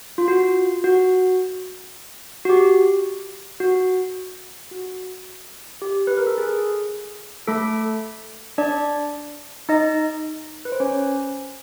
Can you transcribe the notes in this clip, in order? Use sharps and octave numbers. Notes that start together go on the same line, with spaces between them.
F4
F#4
F#4
F#4
G4
F#4
F#4
G4
B4
A#4
A4
G#4
A3 A4
D4 D5
D#4 D#5
B4
C5
C#4 C#5